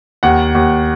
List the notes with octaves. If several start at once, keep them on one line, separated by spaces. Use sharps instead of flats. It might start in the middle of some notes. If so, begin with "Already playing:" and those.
D#2 F#5
D#2